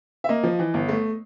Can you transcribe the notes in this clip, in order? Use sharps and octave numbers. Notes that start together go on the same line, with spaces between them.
E5
A#3 D#5
F3
E3
G1
A3